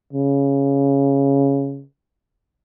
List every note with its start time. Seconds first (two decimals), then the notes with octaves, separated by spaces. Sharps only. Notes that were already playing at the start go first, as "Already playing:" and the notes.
0.13 C#3